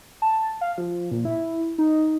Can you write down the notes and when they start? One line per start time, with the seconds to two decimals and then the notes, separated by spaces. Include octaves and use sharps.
0.22 A5
0.61 F5
0.78 F3
1.11 A#2
1.25 E4
1.78 D#4